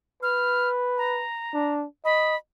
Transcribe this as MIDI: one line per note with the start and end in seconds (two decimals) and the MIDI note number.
0.23 1.24 71
0.23 0.69 89
0.98 1.74 82
1.54 1.85 62
2.05 2.36 75
2.05 2.36 83